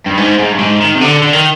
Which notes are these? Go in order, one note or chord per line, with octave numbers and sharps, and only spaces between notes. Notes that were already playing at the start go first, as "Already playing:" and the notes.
G2
G#2
G#2
G2
G#2
D#3
C3
D3
D3
D#3